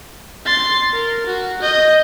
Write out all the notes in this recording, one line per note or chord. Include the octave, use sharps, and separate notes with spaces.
C6 A6
A#4
F#4
D#5 G6